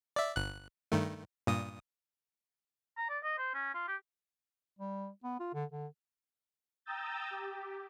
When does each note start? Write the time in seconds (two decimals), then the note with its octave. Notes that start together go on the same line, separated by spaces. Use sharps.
0.16 D5 E5
0.36 G1 F#6
0.92 G2 D#3 A3
1.47 G2 A#2 D#6
2.97 A#5
3.09 D5
3.24 D#5
3.38 C5
3.54 C#4
3.74 F4
3.88 G4
4.79 G3
5.24 B3
5.40 F4
5.54 D3
5.71 D3
6.85 G5 A#5 D#6 E6 G6 A6
7.31 G4